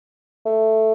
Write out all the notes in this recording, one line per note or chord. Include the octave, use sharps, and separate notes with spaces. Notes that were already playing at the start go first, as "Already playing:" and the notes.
A3